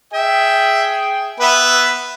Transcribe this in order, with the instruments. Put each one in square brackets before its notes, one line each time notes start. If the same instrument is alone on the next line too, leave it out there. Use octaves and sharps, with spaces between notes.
[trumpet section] G#4 G5 [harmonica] E5
[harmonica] B3 B4 E5